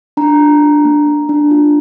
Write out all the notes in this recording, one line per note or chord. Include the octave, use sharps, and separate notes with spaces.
D4 A#5
F4
D4
A#3
A#3
D4
F4